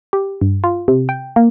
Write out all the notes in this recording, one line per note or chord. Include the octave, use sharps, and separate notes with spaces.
G4
G2
F4
C3
G5
A#3